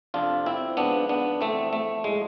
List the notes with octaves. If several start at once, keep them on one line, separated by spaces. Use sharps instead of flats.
F2 C3 F3 D4 F4
C4 E4
G#2 F3 B3 D4
B3 D4
F2 E3 A3 C4
A3
A2 F3 G#3